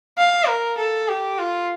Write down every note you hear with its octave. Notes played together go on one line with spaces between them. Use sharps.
F5
A#4
A4
G4
F4